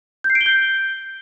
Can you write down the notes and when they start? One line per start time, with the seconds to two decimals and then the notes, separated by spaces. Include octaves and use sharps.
0.24 G6
0.30 C7
0.35 D7
0.41 G7
0.46 G6